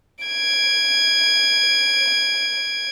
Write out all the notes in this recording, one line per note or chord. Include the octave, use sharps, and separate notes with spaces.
G#6 D7